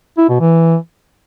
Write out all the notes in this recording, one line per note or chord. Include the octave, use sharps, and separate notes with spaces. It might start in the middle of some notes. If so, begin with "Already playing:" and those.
E4
B2
E3